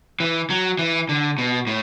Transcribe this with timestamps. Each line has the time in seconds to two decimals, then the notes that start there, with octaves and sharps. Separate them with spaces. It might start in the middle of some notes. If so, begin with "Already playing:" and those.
0.20 E3
0.50 F#3
0.79 E3
1.09 D3
1.38 B2
1.67 A2